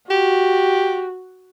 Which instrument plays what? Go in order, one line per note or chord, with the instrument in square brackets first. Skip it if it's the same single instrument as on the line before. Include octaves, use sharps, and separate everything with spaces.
[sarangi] F#4 [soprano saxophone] G4